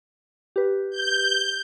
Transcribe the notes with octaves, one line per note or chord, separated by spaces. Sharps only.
G4 B4
G6